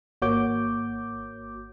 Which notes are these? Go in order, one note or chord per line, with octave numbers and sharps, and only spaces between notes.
G#1 A#3 F#4 C#5 D6 G6